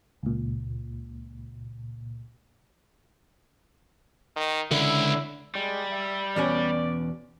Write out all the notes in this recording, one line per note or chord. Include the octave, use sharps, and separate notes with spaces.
C#2 A#2
D#3
C#2 D3 E4
G3 G#3
E5
E2 B2 C#4 D5